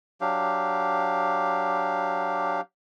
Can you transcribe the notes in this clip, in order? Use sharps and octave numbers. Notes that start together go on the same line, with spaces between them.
F#3 D4 G4 F5